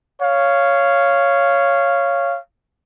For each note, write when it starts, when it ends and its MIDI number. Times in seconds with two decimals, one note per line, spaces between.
0.22 2.38 73
0.22 2.38 77